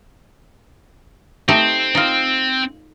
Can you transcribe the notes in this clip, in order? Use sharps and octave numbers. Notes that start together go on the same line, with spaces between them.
A3 C4 D#4 G4
D#4 F4